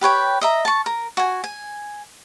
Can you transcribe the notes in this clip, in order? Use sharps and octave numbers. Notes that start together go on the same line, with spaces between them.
G4 B4 C#5 G5
D#5 E5 A#5
A5 C#6
A#4
F#4 G#5
G#5